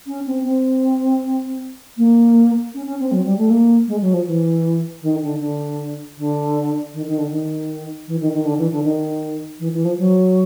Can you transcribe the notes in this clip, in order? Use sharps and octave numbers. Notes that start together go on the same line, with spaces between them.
C#4
C4
C4
A#3
C#4
C#4
C4
F#3
G3
A3
A#3
G#3
F#3
F3
E3
D#3
D3
D3
D3
D#3
D#3
D3
D#3
E3
D#3
D#3
D3
E3
D3
D#3
E3
E3
F3
F#3